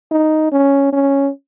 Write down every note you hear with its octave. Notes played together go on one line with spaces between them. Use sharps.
D#4
C#4
C#4